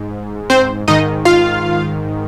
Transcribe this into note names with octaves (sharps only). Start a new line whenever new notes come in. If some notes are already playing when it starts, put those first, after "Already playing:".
Already playing: G#2
C4 C5
G#2 D#3 D#4 D#5
F4 F5